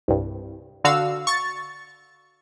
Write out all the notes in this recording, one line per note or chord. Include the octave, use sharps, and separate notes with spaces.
C2 G2
D3 F#4 F5 E6
C#6 A6